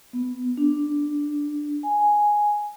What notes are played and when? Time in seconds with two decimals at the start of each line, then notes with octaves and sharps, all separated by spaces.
0.13 B3
0.57 D4
1.83 G#5